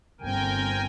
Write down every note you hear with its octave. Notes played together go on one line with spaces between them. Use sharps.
G1 C4 A#4 G5 G#5